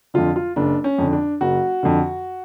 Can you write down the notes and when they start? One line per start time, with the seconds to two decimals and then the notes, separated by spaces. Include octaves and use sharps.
0.14 F2 D3 F4
0.36 F4
0.56 F#1 D4
0.84 C#4
0.98 F2 D3
1.13 D4
1.41 F#1 F#4
1.83 F2 D3